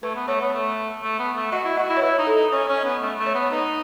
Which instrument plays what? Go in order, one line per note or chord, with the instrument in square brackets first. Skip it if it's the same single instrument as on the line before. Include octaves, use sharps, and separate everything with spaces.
[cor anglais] A3 [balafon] B4
[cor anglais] B3
[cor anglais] A3 [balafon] C#5
[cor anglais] B3
A3
A3
B3
A3
[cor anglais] F#4 [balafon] D#5
[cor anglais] E4
[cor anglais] F#4 [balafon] D#5
[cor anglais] E4
[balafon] C#5
[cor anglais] E4 [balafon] B4
[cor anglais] D#4
[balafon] A4
[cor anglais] D#4
[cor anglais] C#4 [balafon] C#5
[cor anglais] C#4
[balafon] D#5
[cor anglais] B3
A3
A3
[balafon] C#5
[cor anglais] B3
[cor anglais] D#4 [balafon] B4